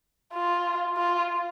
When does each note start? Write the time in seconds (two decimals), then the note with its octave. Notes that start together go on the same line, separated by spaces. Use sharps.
0.34 F4
0.97 F4